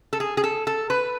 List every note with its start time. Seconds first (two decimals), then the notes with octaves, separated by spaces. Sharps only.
0.13 A4
0.20 G#4
0.37 G#4
0.44 A4
0.67 A4
0.90 B4